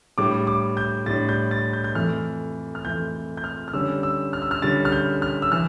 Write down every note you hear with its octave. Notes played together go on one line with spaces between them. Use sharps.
A2 G3 D4 D6
D6
G6
A2 G3 D4 A6
G6
A6
G6
G6
F2 E3 A3 F6
F6
F2 E3 A3 G6
G6
F6
F6
D3 G3 C#4 E6
E6
F6
E6
F6
D3 G3 C#4 A6
F6
G6
F6
E6
E3 F6